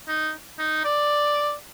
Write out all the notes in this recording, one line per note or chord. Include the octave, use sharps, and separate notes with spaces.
D#4
D#4
D5